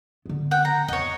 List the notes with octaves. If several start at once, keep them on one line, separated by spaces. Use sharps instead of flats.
D3 B3
F#5 G5
A#5
E2 C#5 D#5